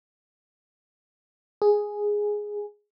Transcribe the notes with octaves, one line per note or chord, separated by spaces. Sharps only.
G#4